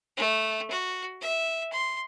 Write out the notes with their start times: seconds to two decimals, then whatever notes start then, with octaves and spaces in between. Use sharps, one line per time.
0.17 A3
0.71 F#4
1.21 E5
1.72 C6